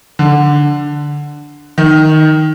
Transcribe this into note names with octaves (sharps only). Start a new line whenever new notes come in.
D3
D#3